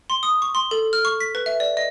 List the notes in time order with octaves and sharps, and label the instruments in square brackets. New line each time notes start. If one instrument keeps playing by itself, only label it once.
[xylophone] C6
D#6
C#6
C6
A4
F6
C#6
B6
B4
E5
D5
D#5